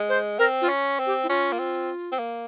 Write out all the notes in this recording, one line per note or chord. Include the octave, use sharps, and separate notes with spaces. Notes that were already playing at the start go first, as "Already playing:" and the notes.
Already playing: G#3
C5
C4 A#4
F4
C#4
C4
G4
E4
C#4 F4
A#3
C4
C4
A#3